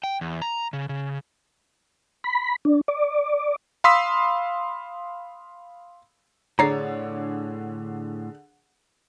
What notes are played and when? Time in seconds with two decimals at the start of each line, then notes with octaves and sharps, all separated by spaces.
0.04 G5
0.21 E2
0.42 A#5
0.73 C#3
0.89 C#3
2.24 B5
2.65 D4
2.88 D5
3.84 F5 B5 C6 D#6 E6 B6
6.59 A2 D3 G#4 C#5 D5 A#5 C7